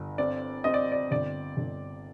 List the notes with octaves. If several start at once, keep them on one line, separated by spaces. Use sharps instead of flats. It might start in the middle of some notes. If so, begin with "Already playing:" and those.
Already playing: G1
C4 D5
C4 D#5
D5
D5
G1 D5
G1